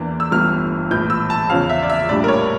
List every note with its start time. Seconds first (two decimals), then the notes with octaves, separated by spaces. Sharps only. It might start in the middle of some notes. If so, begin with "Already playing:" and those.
Already playing: E2 E3 A#3 D4
0.20 E6
0.31 G1 G2 E3 A3 F6
0.91 A#1 A2 E3 G6
1.10 E6
1.30 A5
1.50 E2 C#3 F3 C#4 F5
1.69 E5
1.83 D5
1.90 E5
2.09 A#1 A2 G3 D4 D5
2.24 A#4
2.28 C#5